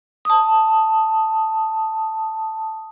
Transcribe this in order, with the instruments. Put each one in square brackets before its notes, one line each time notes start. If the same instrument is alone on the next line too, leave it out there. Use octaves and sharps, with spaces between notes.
[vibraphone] A5 D#6